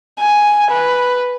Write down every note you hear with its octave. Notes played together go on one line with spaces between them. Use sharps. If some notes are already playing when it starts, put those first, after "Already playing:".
G#5
B4